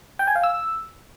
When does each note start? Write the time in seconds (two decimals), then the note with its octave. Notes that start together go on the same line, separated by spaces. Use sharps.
0.19 G5
0.27 G#5
0.35 F5
0.44 E6